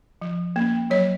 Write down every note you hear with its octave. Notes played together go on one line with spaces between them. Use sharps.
F3
A#3 C#4
F#3 C#5